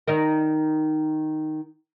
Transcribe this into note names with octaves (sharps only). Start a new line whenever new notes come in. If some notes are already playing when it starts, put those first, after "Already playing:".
D#3 D#4 A#4